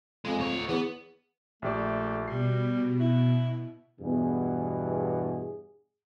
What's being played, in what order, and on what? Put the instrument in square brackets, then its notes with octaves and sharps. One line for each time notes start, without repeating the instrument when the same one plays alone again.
[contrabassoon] F2 [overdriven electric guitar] G#3
[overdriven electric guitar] D2 C#5
[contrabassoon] E2 [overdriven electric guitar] B3
[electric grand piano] A#1 G4 D5 [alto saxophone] A3
[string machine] B2 [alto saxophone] G3 [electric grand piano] C7
[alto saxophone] E4
[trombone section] E2 G2 B2 G#4